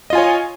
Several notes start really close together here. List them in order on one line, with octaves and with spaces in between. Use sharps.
D#5 F4 G#5 C#5